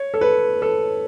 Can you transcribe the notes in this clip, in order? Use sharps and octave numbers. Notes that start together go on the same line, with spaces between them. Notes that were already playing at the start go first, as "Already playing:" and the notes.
Already playing: C#5
A4
B4
A4